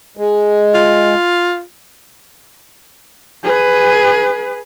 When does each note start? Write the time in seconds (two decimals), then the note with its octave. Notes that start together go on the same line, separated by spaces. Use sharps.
0.17 G#3
0.74 F4
3.44 G#4 B4